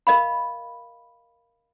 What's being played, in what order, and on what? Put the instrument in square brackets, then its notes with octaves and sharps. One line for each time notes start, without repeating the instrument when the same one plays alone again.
[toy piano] A#4 D#5 F5 B5